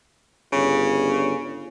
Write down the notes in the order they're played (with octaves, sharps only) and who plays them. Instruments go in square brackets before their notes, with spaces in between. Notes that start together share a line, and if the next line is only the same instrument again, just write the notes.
[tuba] G1 [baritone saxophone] C#3